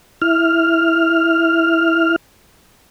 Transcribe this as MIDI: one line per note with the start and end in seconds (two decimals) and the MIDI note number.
0.22 2.16 64
0.22 2.16 89